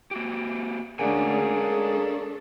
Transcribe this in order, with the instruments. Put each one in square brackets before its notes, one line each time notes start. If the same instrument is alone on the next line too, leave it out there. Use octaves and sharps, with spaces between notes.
[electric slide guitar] A#3 F#4 G4
[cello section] D2 C#4 D4 [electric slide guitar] G#3 F#5 G#5 [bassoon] A#3 [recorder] G#4
[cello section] C#4 D4 A4